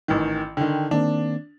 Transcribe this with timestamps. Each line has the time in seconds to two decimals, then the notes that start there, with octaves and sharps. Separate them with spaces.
0.08 A1 D#3
0.57 D3 D#3 G5
0.91 D#3 A#3 C4 D4